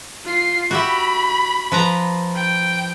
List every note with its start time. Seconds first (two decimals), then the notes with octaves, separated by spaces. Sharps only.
0.25 F4 C7
0.71 F#4 G4 E5 B5
1.72 F3 B4 A#5
2.35 G5